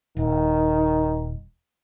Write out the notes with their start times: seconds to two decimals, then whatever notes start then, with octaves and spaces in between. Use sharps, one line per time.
0.17 D#1 D#3